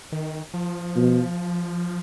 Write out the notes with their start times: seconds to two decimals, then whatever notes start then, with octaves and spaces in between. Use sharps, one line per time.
0.12 D#3
0.54 F3
0.96 B2